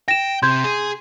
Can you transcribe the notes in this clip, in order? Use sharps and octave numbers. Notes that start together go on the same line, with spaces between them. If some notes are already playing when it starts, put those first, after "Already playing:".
G5 A#6 E7
C3 C6 G6 G#6
G#4